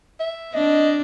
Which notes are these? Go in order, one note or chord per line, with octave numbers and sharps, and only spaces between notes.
E5
C4 D4 D#5